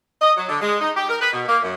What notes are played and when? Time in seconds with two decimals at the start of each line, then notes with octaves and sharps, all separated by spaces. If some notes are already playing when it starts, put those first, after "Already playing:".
0.22 D#5
0.36 F#3
0.49 D3
0.61 G#3
0.80 D#4
0.95 G4
1.09 A#4
1.20 B4
1.33 B2
1.48 A#3
1.62 F#2